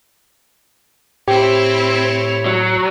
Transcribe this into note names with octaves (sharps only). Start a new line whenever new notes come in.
A2 C4 E4 G4 C#5
F#3